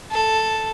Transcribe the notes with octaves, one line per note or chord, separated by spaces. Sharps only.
A4